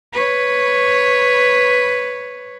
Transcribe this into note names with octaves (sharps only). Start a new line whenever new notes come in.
B4 C#5